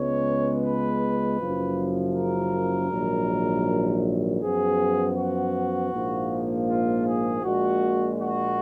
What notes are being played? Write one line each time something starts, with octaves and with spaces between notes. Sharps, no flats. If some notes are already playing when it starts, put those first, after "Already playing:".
Already playing: C#2 C#3 G#3 B3 C#5
B4
F#1 F#2 C#3 F3
A#4
A#1 G#2 D#3 F#3
F#2 F3 B3 G#4
F#4
A#1 G#2 F3 A#3
F4
G#4
A#1 A#2 G#3 F#4
F#4